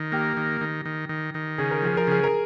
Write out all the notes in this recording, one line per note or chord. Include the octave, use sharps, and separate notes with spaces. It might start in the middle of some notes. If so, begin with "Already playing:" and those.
Already playing: D#3
A#3 G4
D#3
D#3
D#3
D#3
D#3
C#3 G#4
A#4
F3 G#4
A#4
C#3 G#4
A#4